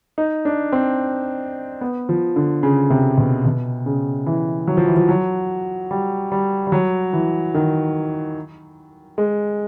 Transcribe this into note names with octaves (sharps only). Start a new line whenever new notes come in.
D#4
D4
C4
B3
F3
D3
C#3
C3
B2
B2
C#3
E3
F#3
F3
E3
F3
F#3
G3
G3
G3
F#3
E3
D#3
G#3